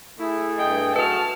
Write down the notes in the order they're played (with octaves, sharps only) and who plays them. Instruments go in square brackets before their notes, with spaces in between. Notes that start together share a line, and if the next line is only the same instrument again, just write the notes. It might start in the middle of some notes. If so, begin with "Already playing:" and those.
[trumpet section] A3 G#4 [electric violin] E4
[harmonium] G2 D#5 [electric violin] G5
[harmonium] F#4 [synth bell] B4 [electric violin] A5 F6